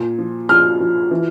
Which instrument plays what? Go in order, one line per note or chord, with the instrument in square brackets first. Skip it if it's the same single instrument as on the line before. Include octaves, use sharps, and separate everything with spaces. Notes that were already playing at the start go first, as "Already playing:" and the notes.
Already playing: [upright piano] A#2
F3
F3 F6
F3
E3